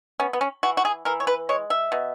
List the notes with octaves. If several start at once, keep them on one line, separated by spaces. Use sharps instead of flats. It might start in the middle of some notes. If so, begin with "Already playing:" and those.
B3 C#4
B3
C#4
E3 F#4
F#4
G#4
E3 A#4
C#5
B4
G#3 C#5
E5
B2